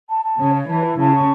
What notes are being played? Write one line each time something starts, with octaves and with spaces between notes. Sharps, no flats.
A5
A5
C#3 C#5
C#5
E3 A5
E4
C#3 A5
C#6